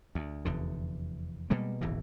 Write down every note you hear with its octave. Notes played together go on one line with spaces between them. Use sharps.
D2
F1 E2 D3
B2 G3 G#3 A#3
D1 G#1 B2 E3